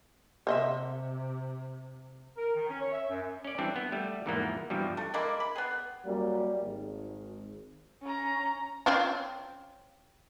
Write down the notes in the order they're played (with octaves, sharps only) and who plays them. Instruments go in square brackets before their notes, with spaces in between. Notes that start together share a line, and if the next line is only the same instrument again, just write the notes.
[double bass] C3 [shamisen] C5 D#5 E5
[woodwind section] A#4
D#3
C#4
C#5
E5
F#2
[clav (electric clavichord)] C#4 D5
E3 G3 C4 D4
B3
G3 A3
E2 G#2 E3 F3 A#3 B3
G2 B2 E3 F3 G3
[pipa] A3
G#3 A#3 D4 E4
B5
B3 G#4
[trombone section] F#2 G3 A#3
G#1
[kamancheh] C#4 A#5
[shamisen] C4 C#4 F4